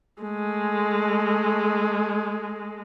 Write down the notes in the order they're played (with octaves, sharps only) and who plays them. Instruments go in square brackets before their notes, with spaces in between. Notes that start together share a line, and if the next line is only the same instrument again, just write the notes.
[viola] G#3 A3